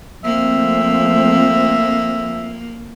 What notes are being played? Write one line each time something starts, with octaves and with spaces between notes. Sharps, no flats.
F3 A3 A#3 C4 E5